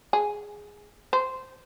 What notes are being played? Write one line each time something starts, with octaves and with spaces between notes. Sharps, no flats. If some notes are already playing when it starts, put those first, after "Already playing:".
G#4
C5